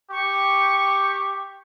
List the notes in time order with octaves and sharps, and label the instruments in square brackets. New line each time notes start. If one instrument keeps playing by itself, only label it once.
[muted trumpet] G4 [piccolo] C#6